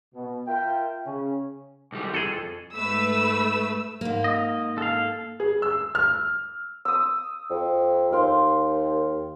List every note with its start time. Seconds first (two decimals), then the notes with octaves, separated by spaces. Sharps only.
0.15 B2
0.47 F4 A#4 E5 G5
1.06 C#3 C#4
1.92 B1 G3
2.14 F2 G#4 A4
2.75 G#2 A3 B4 E6
4.01 G#2 A#3
4.24 D#5
4.78 A4 F5
5.40 G#4
5.62 E6
5.95 F6
6.85 D#6 E6
7.50 F2
8.12 D#2 F5 G5 C6